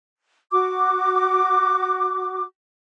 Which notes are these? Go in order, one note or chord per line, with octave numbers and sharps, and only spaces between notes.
F#4 D6